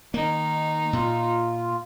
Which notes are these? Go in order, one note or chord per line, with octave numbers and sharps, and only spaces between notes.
D#3 A#3 D#4
A#2 F4